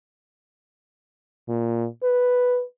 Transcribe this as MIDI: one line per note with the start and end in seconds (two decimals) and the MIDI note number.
1.48 1.86 46
2.03 2.63 71